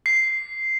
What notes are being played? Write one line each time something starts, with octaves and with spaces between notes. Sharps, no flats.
C7